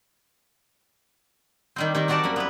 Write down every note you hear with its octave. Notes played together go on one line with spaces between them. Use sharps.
D#3 G3 C4
D#3 C4 G4 A#4
C4 F#4 A#4 D5 F#5 A5
F#2 G3 A#3 B5
B3 E4 B4